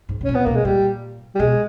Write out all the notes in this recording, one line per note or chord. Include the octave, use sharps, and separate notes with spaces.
G#2
B2
A#2 C#4
B3
B2 A#3
G#3
A#2 G3
G3
B2 G#3